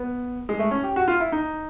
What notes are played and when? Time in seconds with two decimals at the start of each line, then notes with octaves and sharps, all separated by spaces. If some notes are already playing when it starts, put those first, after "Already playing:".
Already playing: B3
0.49 G#3
0.59 A3
0.71 C#4
0.84 G4
0.96 F#4
1.08 F4
1.20 E4
1.32 D#4